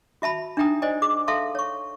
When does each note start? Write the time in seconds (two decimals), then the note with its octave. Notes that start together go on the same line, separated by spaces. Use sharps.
0.22 F#4 E5 A5 B5
0.57 D4 D#4 E5 G5 A#5 D#6
0.82 C5 D5 D#5 G#5
1.02 G#4 D6
1.28 A4 E5 F5 A5 C6
1.55 C#5 C#6